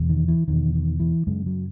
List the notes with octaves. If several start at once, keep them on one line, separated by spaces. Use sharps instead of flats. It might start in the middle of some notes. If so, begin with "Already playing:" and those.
Already playing: E2 B2
D#3
E3
E2 B2 D#3
D#3
E3
F#2 C#3 G#3
F#3